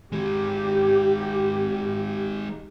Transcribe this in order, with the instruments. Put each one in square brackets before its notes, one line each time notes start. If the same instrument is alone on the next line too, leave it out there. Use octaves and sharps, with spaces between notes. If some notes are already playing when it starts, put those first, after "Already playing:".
[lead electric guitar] D#3 G#3 [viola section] G4